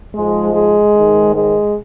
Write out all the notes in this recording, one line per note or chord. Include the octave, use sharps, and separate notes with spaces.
G#2 F3 G#3
G#3
G#2 D#3
G#3